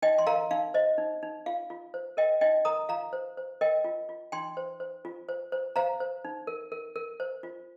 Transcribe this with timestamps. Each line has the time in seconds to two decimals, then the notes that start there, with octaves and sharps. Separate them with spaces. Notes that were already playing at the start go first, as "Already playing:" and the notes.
0.02 D#4 D#5 G5
0.18 C6
0.27 A#4 F5 A#5
0.51 D#4 F5
0.74 C5 D#5
0.98 D#4
1.23 D#4
1.46 F4 F5
1.70 F4
1.94 C5
2.17 A#4 D#5 G5
2.41 D#4 D#5 G5
2.65 A#4 A#5 D#6
2.89 F4 F5 A#5
3.13 C5
3.37 C5
3.61 A#4 D#5 G5
3.84 F4
4.09 F4
4.32 D#4 G5 C6
4.57 C5
4.80 C5
5.05 F4
5.29 C5
5.52 C5
5.76 C5 F5 A#5
6.00 C5
6.25 D#4
6.47 A#4
6.72 A#4
6.96 A#4
7.20 C5
7.43 F4